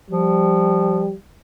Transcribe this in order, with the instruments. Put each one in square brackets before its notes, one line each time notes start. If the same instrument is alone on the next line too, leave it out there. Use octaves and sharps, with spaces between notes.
[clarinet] F3 [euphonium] G3